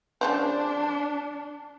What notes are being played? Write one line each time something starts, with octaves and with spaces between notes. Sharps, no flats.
C#3 F3 C4 D4